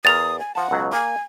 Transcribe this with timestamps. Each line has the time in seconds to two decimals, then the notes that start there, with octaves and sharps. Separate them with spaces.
0.05 E2 A#4 D#6 A6 F7
0.39 G#5
0.55 F3 F#5 A5
0.71 C#2 B2 F#3
0.93 A#3 G#5